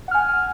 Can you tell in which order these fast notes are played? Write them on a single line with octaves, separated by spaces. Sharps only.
F#5 F6 G#5